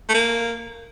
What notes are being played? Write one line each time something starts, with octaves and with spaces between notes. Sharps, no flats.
A3
A#3